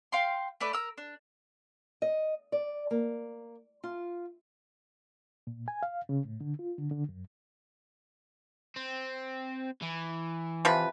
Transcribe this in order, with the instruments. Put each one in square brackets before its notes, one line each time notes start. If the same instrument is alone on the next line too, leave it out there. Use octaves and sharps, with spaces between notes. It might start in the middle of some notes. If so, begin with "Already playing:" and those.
[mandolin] F5 G5 C6
A3 B4 D5
A#4 E6
D4
[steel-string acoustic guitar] D#5
D5
A#3
F4
[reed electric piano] A#2
G#5
F5
C#3
A2
D3
F4
D3
D3
F#2
[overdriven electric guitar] C4
E3
[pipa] C3 F3 B4